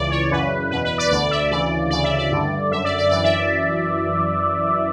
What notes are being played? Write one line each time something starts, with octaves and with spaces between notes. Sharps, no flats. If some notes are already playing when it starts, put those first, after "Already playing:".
Already playing: C#2 C#3 E3 D5
C#5
F#2 C#3 E3 B4
E2 B2 B4
B4
D5
D2 D3 D5
E5
D2 C#3 E3 D5
D2 C#3 E3 D5
E5
D5
G2 D3
F#2 D3 E5
D5
D5
F#2 E3 D5
E5